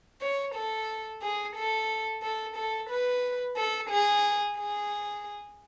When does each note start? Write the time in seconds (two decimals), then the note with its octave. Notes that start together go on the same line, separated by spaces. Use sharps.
0.22 C#5
0.55 A4
1.22 G#4
1.56 A4
2.23 A4
2.56 A4
2.90 B4
3.57 A4
3.90 G#4
4.58 G#4